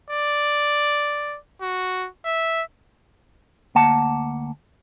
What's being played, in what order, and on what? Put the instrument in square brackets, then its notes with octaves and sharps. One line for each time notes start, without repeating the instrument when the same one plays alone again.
[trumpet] D5
F#4
E5
[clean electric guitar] D2 A#3 F#5 A5